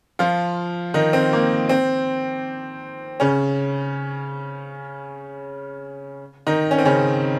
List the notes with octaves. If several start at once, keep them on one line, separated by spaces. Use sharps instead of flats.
F3 F4
D#3 D#4
C4
A#3
C4
C#3 C#4
D#3 D#4
C#4
C4
C#3 C#4